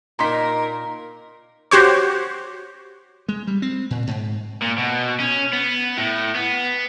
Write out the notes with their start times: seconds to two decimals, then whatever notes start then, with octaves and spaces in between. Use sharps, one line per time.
0.19 A#2 D#4 A#4 A#5 C6 B6
1.71 F#4 G4 C5 C#5
3.29 G#3
3.47 G3
3.62 C4
3.91 A#2
4.07 G#2
4.62 A#2
4.78 B2
5.19 C#4
5.53 B3
5.98 A2
6.35 B3